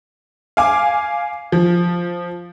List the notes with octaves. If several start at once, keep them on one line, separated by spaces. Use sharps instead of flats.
F5 G#5 D6
F3